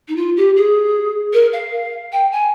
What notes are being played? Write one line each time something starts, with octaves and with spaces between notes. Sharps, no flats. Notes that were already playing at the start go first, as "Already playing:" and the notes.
D#4
F4
G4
G#4
A#4
F5
G5
G#5